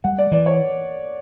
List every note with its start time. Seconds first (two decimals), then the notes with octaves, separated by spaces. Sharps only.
0.04 G3 F#5
0.18 D5
0.32 E3 D5
0.46 C#5